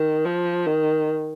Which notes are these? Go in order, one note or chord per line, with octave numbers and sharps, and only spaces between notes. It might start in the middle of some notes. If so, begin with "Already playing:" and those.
Already playing: D#3
F3
D#3